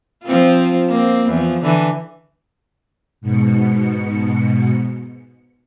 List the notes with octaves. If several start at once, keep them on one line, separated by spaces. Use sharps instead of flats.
F3 C4 F4
A#3 C4
E2 F3
D3 E3
G#2 B2 C#7